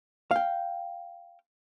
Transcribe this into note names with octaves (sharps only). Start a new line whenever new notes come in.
F5 G5